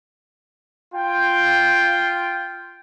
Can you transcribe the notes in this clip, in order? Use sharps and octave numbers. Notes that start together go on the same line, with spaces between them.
F4 G5